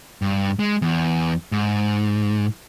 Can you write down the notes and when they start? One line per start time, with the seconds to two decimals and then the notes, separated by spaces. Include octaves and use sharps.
0.22 G2
0.59 G#3
0.82 E2
1.52 G#2